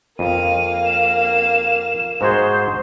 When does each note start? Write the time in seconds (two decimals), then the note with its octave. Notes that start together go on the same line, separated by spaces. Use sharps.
0.19 F2 A#3 F5 D#7
0.85 E7
2.21 G#2 F#4 G#4 C5 C6